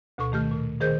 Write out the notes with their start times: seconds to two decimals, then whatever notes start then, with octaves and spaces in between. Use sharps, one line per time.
0.18 D2 B2 A4 C#6
0.32 D#3 A3 G4 F6
0.51 A#2
0.81 D#3 G#4 A#4 C5 G6